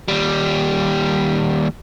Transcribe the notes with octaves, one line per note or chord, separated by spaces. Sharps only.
D#2 G3